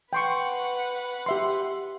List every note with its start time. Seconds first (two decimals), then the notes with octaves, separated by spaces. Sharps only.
0.13 B4 F#5 G5 C6 C#6
1.26 G4 E5 C6